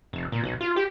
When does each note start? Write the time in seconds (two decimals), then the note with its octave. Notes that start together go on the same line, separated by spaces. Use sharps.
0.13 F1
0.32 A#2
0.44 B1
0.61 F4
0.76 G4